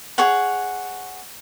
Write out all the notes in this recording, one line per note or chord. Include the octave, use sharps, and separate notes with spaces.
G#4 C#5 F#5